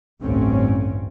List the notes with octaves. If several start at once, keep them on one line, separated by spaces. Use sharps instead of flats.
A1 D2 G2 D3 C4 C#4